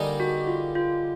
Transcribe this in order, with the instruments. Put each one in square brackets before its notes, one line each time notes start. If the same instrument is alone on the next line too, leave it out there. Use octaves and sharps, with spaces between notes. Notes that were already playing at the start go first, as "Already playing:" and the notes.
Already playing: [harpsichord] D3 G3 A#3 D#4 G#4
[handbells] F#4
F4
F4